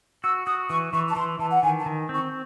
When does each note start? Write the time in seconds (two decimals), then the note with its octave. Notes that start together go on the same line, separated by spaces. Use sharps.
0.24 F#4 E6
0.47 F#4 D#6
0.70 E3 C#6
0.93 E3 C#6
1.09 A5
1.16 E3 C6
1.39 E3 A5
1.51 F#5
1.63 D#3 G#5
1.80 A5
1.86 D#3
2.09 C4
2.14 C#6